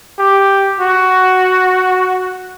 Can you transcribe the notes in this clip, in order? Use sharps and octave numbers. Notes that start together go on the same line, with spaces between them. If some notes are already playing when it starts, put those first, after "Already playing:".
G4
F#4